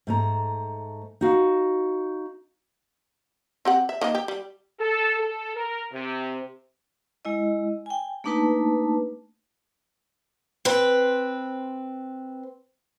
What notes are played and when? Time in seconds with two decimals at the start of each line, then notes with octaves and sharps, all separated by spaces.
0.07 G#2 A3 A#5
1.21 D#4 F#4 F5
3.65 C4 G4 F#5
3.89 E5
4.01 D#3 A#3 D#5
4.15 G4
4.28 G3
4.79 A4
5.19 A4
5.56 A#4
5.92 C3
7.25 G#3 E4 D#5
7.86 G5 G#5
8.24 A3 A#3 D4 D#4 B4 A5
10.65 C4 B4